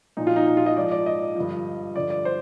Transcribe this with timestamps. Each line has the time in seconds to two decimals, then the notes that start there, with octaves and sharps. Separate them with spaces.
0.17 A#2 F3 D#4
0.27 F4
0.36 D#4
0.47 D#4
0.57 F4
0.66 D#5
0.77 G#2 F3 D5
0.91 D5
1.06 D#5
1.35 G2 D3 F3
1.95 G2 D3 F3 D5
2.10 D5
2.25 C5